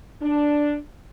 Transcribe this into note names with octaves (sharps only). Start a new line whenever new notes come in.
D4